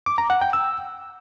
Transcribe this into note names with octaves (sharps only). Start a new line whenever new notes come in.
D6
A#5
F#5
G5
E6